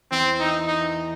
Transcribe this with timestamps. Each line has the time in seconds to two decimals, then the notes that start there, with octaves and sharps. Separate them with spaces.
0.11 E2 E3 C4
0.40 D#4
0.67 D#4